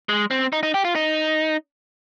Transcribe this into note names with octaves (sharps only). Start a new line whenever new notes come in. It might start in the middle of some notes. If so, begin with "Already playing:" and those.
G#3
C4
D#4
D#4
G4
F4
D#4